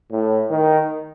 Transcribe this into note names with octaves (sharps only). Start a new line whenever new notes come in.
A2
D#3